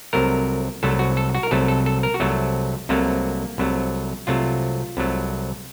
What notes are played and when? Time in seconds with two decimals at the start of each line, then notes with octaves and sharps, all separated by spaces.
0.13 C2 C3 F#3 A3 A#4
0.83 C2 C3 F#3 A3 A4
0.99 F#4
1.17 A4
1.35 F#4
1.43 A#4
1.51 C2 C3 F#3 A3 A4
1.68 A4
1.86 A4
2.03 A#4
2.14 F#4
2.20 C2 C3 F#3 A3 A4
2.89 C2 C3 F#3 A3 A#3
3.58 C2 C3 F#3 A3
4.27 C2 C3 F#3 A3 F4
4.97 C2 C3 F#3 A3